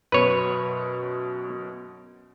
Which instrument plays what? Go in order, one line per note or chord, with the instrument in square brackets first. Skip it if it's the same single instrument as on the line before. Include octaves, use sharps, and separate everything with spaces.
[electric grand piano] F#2 B2 [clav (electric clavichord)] B4 C#5